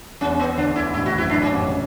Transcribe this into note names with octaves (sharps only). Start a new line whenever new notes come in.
E2 E3 C#4
B3
D2 D3 D4
E4
G#2
A1 A2 E4
G#1 G#2 F#4
F#2 E4
F#2 D4
G#1 G#2 C#4
A1 A2
C#3